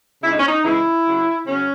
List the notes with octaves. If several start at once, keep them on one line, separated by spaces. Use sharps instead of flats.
C#3 G#3 E4
D#4
C#4
D#4
C#3 E3 G#3 E4
C#3 F#3
C#3 F#3 C#4